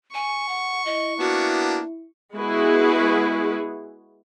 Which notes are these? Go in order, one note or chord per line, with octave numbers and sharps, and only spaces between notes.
G#5 C#6
F#5
E4 D#5
A#3 B3 D4 F#4
G#3 B3 E4 F#4 G#4 B4